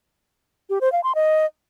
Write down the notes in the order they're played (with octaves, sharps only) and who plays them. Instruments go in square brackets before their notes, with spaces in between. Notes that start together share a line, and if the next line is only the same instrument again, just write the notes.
[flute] G4
C5
F5
C6
D#5